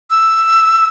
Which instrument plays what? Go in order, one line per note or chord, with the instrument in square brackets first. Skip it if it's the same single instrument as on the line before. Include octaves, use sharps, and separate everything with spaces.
[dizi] E6